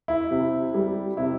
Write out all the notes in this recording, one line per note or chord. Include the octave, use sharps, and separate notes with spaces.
E4
C3
G3
C3 E4